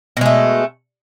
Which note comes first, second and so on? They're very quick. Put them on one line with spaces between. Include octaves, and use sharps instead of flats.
B2 G#3 A3